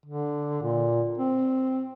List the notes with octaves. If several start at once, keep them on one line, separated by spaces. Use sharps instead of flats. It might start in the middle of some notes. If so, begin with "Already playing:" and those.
D3
A#2
C4